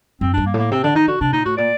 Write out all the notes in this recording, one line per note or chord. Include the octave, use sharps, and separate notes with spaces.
F#2 C4
G2 D4
A#3
A2
A#3
C3 C4
D3 D4
D#3 D#4
D3 F#4
C3 D4
A#2 D#4
A2 F#4
A#2 D5